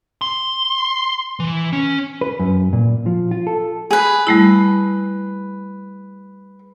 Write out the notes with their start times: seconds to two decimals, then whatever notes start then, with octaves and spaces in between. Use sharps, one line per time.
0.21 C6
1.40 E3
1.73 C#4
2.21 B4
2.40 F#2
2.73 A#2
3.06 F3
3.31 F4
3.47 A4
3.91 G#4 B4
4.27 G3 A3 E4